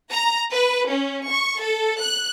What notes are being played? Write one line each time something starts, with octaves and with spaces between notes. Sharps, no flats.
A#5
B4
C#4
C#6
A4
F#6